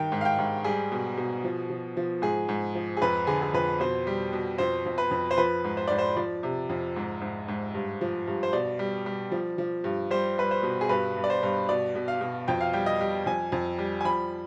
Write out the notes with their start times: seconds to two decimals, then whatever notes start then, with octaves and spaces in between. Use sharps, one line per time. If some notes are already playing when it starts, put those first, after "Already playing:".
Already playing: G2 D#3 G5
0.12 G#2
0.21 F5
0.25 G5
0.39 G#2
0.64 G3 G#4
0.92 B2
1.17 B2
1.44 F3
1.70 F3
1.97 F3
2.22 G#2 G#4
2.49 G#2
2.75 F3
2.97 G#4
3.02 F2 B4
3.27 D3 G#4
3.42 G#4
3.54 F2 B4
3.80 B2 C5
4.07 G3
4.33 B2
4.58 F2 C5
4.86 F2
4.98 B4
5.11 F2
5.31 C5
5.38 F3 B4
5.64 G#2
5.77 C5
5.88 G#2 D5
5.98 C5
6.16 F3 D5
6.43 C3
6.70 F2
6.96 G#2
7.21 G#2
7.48 G#2
7.75 G2
8.01 F3
8.27 G2
8.43 C5
8.53 B2 D5
8.79 G3
9.06 G3
9.32 F3
9.58 F3
9.84 G2
10.11 G3 C5
10.38 G3 B4
10.51 C5
10.63 B2
10.81 G#4
10.89 G2 B4
11.17 G2
11.24 D5
11.30 C5
11.43 G2
11.69 B2 D5
11.95 B2
12.08 F5
12.21 B2
12.48 F2 G5
12.60 F5
12.73 G3 G5
12.86 D#5
13.01 G3
13.26 F2 G#5
13.52 F2
13.78 G3
14.01 G#5
14.05 F3 B5